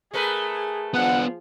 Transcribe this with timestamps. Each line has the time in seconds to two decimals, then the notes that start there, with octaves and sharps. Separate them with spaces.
0.14 A3 G#4 A#4 B4
0.94 F3 B3 D4 F#5